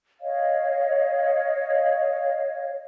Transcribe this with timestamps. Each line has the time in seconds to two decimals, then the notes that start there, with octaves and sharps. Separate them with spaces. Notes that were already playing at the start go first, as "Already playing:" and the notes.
0.21 C#5 D#5 F5